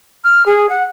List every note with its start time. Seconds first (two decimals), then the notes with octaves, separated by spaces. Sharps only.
0.24 F6
0.46 G#4
0.69 F#5